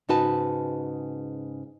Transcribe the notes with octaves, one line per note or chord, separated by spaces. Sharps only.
G#2 C#3 D#4 F#4 B4 A5